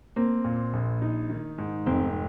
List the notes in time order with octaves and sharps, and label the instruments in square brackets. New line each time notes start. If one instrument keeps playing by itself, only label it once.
[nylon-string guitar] A#3 [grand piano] C4
[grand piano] A#2
A#1
D#4
D#3
G#2
[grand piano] F1 [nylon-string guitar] C4